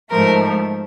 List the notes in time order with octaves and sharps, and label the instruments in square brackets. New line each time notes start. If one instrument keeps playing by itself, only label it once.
[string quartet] G#2 F3 A3 A#4